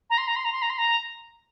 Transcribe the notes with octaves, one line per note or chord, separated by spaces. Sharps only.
A#5
C6
A#5
C6
A#5
C6
A#5
C6
A#5